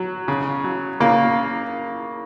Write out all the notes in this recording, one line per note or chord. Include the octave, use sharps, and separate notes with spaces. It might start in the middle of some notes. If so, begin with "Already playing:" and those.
Already playing: F#3
C#3
F#3
C#3 A#3